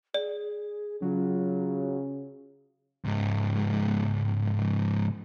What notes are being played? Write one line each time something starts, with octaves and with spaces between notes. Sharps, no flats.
G#4 D5
C#3 F#3 F4
C#2 G#2